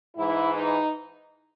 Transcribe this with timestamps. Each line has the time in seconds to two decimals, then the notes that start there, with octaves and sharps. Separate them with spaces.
0.16 G#2 E3 E4
0.55 D#4